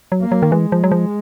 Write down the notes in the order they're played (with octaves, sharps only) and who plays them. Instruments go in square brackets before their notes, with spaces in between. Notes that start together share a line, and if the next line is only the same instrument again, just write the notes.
[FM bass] F#3
[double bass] A#3
[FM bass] F#3
D#3
[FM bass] E3 [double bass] G#3
[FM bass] F3
F#3
F3